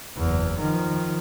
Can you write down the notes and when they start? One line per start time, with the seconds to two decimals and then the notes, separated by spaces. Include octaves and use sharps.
0.18 F#1 E2
0.60 D#3 F3